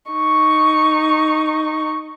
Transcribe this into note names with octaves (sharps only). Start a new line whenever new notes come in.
D#4 C#6